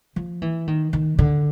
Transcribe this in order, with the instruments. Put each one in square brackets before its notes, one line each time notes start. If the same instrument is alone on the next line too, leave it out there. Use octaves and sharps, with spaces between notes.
[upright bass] F3
E3
D#3
D#3
D3